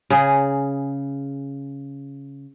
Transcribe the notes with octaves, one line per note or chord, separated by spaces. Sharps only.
C#3 G#4